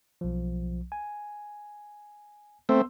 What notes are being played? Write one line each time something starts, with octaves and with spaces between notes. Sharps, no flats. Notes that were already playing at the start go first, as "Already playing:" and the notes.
B1 F3
G#5
A3 B3 C4 C6 E6